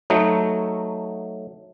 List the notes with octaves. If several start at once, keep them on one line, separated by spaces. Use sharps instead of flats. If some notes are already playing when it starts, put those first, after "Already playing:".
F#3 A3 D#4